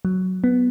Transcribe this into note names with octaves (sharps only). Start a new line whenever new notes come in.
F#3
B3